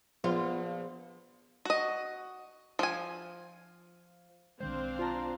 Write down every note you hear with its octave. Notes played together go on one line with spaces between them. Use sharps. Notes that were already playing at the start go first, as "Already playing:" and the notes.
A#1 F3 B3 F4
F#4 D#5
F3 G#5
B1 D#3 G#3 C4 D4 C5 F5
F4 C5 A5 A#5